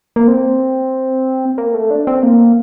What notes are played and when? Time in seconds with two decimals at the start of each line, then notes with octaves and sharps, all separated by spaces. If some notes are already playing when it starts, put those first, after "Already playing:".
0.16 A#3
0.28 C4
1.58 A#3
1.74 A3
1.91 D4
2.07 C4
2.23 A#3